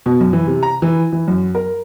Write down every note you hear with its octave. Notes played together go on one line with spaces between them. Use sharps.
B2
F#2
E3
C3
A#5
E3
E3
F#2
A#4